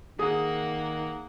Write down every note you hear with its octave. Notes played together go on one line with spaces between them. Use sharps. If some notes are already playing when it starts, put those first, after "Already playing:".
D#3 A#3 G#4 F#5 D#6